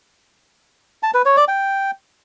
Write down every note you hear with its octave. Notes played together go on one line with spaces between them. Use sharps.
A5
B4
C#5
D5
G5